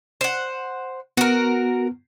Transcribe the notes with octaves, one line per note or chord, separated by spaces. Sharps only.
C5 F#5
B3 F#4 A#4